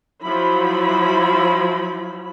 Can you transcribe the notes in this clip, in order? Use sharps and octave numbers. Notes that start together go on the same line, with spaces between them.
F3 F#3 E4 B5